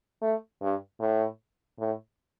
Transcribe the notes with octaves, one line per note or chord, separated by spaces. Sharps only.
A3
G2
A2
A2